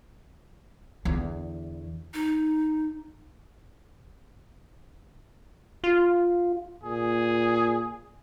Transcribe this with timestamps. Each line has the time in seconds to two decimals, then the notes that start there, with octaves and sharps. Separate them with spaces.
1.05 E2 D3
2.14 D#4
5.84 F4
6.83 A#2 G#4